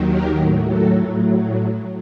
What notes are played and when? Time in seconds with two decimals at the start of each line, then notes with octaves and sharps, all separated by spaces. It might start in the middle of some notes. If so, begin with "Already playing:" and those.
Already playing: D#2 D#3 F#3
0.08 G4 A#4
0.38 A2 F#3
0.67 F#4 A4